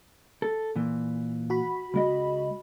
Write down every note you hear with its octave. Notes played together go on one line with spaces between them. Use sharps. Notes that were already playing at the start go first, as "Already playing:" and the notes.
A4
A#2 E3
F#4 B5
C#2 G#3 D#5